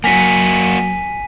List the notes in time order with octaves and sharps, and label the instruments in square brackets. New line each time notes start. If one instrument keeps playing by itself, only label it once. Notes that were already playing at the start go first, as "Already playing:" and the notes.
[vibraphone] F#3 [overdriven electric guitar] A#3 F#4 [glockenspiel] G#5 B6 D#7